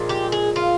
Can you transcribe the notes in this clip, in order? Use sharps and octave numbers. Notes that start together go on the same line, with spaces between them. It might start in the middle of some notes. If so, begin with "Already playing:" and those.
Already playing: A#2 F3 G#3
G4
G#4
F4